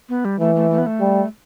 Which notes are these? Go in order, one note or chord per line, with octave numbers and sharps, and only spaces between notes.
B3
G3
E3 A3
A3
A3
B3
A3
G3